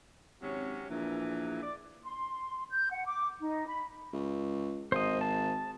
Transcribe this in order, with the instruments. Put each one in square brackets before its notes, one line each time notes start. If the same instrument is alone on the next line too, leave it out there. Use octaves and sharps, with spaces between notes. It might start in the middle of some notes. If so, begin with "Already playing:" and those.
[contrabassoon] G#1 [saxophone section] C3 F#3 C#4
[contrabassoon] A#1 [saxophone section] E2 A#2 E3
[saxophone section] D5
[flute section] C6
G6
F#5
D6
D#4
B5
[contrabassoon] C#2
[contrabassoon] G#1 [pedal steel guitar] C5 D#5
[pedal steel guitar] A5